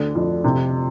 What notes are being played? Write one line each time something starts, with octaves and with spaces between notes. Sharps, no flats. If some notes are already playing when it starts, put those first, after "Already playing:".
Already playing: D2 D3
F2
C3